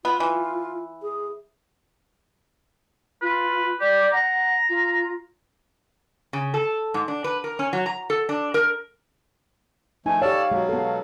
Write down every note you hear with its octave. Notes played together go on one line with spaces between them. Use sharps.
B3 F4
E3
G#4
F4 B4
G4 D5
F#5 A#5
F4
C#3
A4
G#2
D4
B4
A#4
C#4
F#3
A#5
A4
D4
A#4
F3 A3 D#4 G#5
G4 A4 C#5 D5 F5 A5
B2 F#3 G#3
B3 A4